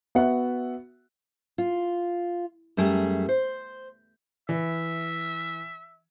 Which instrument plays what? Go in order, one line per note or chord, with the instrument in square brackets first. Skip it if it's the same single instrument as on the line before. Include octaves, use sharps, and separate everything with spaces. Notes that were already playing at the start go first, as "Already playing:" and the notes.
[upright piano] B3 F#4 E5 F#5
[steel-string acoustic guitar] F4
F#2 G3 A3 G#4
C5
[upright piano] E3 [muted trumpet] E5